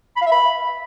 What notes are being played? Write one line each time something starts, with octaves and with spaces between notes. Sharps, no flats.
B5
F5
E5
B5